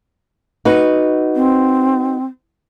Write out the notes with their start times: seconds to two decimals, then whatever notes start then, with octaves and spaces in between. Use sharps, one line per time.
0.65 D#4 F#4 B4
1.36 C4